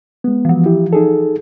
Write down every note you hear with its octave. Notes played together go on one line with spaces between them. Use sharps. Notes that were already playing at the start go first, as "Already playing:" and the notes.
G#3 B3
E3 F3
E4 G4
D#4 G#4 A4